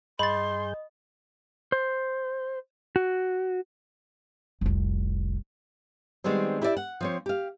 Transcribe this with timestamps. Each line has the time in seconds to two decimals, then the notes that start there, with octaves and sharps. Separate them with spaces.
0.19 G2 G#4 D#5 B5 C6 G6 A6
1.72 C5
2.96 F#4
4.61 F1 C2
6.24 D#3 G3 G#3 B3 C4
6.62 E4 G4 A#4 C#5 D5 E5
6.77 F#5
7.01 F3 C4 C#5
7.26 G4 F5